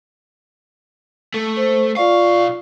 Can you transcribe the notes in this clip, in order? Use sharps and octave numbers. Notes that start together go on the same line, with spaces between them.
A3
C5
B1 F4 D5 F5 C#6